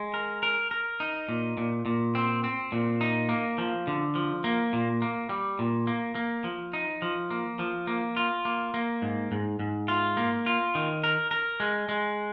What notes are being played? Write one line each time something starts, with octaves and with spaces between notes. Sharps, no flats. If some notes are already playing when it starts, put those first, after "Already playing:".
Already playing: G#3
A#4
A#4
A#4
D#4
A#2
A#2
A#2
C4
C4
A#2
D#4
A#3
F3
D3
F3
A#3
A#2
A#3
G3
A#2
A#3
A#3
F3
D#4
F3
A#3
F3
A#3
F4
A#3
A#3
G#2
G#2
G#2
F4
A#3
F4
D#3
A#4
A#4
G#3
G#3